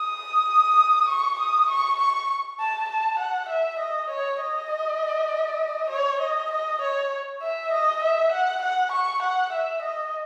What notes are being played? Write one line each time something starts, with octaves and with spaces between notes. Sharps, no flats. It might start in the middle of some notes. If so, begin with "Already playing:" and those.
Already playing: D#6
C#6
D#6
C#6
C#6
A5
A5
F#5
E5
D#5
C#5
D#5
C#5
D#5
D#5
C#5
E5
D#5
E5
F#5
F#5
C#6
F#5
E5
D#5